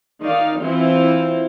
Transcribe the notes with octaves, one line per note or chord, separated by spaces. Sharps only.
D#3 D#4 D5 F5
E3 C4 E4 F4